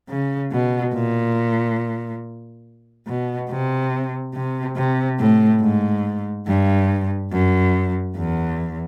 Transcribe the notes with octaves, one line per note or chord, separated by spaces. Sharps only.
C#3
B2
A#2
B2
C3
C3
C3
A2
G#2
G2
F#2
E2